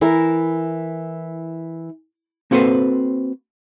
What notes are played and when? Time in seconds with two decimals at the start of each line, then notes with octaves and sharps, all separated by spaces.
0.01 E3 E4 A#4
2.51 A#3 C4 F#4 A4 B4 C5